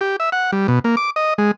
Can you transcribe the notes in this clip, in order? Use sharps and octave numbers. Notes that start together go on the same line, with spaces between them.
G4
E5
F#5
G3
B2
A#3
D6
D#5
G#3